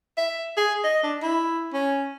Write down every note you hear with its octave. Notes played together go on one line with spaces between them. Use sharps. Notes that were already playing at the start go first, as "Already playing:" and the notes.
E5
G#4
D#5
D4
E4
C#4